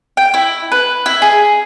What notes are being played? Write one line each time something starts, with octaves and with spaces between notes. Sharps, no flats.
G5
E4
B4
E4
G#4